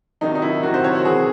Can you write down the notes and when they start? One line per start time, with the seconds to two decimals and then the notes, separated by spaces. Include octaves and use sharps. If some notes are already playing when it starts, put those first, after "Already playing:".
0.21 C3 D#3 F#3 D#4
0.35 D#4
0.42 E4
0.63 C3 D#3 F#3 F#4
0.74 C5
0.84 C#5
0.95 F#4
1.05 C3 E3 G#4